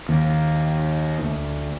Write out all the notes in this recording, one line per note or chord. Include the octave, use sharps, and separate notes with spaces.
D#2
D2